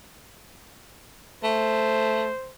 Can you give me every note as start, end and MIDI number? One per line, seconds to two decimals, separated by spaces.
1.44 2.30 57
1.44 2.53 72